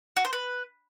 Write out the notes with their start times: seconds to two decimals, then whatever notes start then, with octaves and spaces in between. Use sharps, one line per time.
0.17 F#4
0.25 C5
0.33 B4